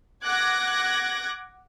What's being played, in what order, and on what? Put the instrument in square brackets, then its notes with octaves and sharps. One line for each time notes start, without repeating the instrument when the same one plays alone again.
[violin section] F#5 D6 F#6 G#6 A#6